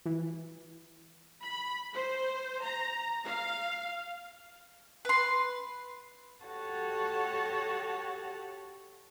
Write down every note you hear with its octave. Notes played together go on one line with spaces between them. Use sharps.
E3
B5
C5
A#5
F5
B4 C6
F#4 G4 A4 C#5 F#5 A5